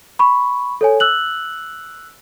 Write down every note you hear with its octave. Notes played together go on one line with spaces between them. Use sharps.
B5 C#6
A4 C#5 G#5
E6 F#6 F#7